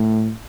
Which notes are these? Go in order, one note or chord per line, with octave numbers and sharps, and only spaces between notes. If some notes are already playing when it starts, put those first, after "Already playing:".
Already playing: A2